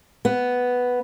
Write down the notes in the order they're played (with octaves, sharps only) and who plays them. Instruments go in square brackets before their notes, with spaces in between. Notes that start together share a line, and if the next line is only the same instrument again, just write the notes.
[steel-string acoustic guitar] B3